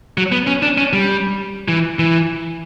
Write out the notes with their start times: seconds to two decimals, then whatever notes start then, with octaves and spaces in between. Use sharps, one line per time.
0.18 F#3
0.32 B3
0.47 C#4
0.62 D4
0.78 C#4
0.93 G3
1.68 E3
1.99 E3